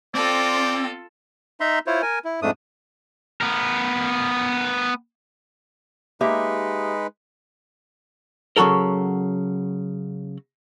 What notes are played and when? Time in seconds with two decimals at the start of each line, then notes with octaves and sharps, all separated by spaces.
0.15 C4 F4 A4 D5
1.60 D#4 E5 A#5 C6
1.87 E4 F4 C5 C#5
2.02 A#4 G#5
2.25 E4
2.42 F2 G#2 A3 D4 D#6
3.41 B3 A#4
6.21 G#3 A#3 D#4 G4 B4 E5
8.57 C#3 F#3 F#4 A4 A#4